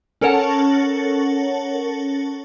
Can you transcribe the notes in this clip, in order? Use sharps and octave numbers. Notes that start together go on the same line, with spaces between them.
C#4 A4 A#4 C#5 F#5 A5